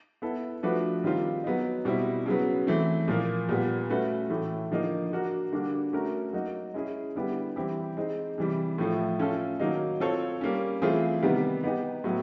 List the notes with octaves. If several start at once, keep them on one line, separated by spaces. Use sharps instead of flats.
B3 E4 A4
F3 A3 D4 F#4 B4
D#3 G3 C4 F4
F#3 B3 D#4
B2 G3 C4 E4
C#3 F#3 B3
E3 A3 C4
A#2 F3 A#3
A#2 G3 B3
A3 C#4 F#4 B4
A2 E3 A3
D3 F3 A#3 D#4
A#3 D4 F#4 A#4
D3 G3 A#3 D4 F#4
A3 C#4 F#4 A#4 C#5
F#3 A#3 D#4 F#4
G#3 C#4 E4 G#4
D3 G3 B3 E4 G4
E3 G3 C4 E4 G4
G#3 C4 D#4
C3 E3 G3
A2 F3 A3
A3 C#4 F4 A4
D#3 F#3 A#3 D#4
C4 F4 A4 C#5
G3 A#3 C#4
E3 A3 C4 F4 G#4
C3 D#3 G3 B3
B3 D#4 G4
A2 F#3 B3